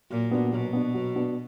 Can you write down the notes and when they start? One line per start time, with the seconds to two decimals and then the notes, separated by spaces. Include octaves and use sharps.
0.10 A#2 F#3
0.31 B3 D4 F#4
0.52 B2 F#3
0.73 B3 D4 F#4
0.94 F#3
1.15 B3 D4 F#4